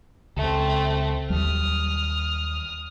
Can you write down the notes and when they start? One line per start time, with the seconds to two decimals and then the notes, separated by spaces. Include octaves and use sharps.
0.37 C#2 A3 C4
1.30 D#2 F#3 G3 D#6 F6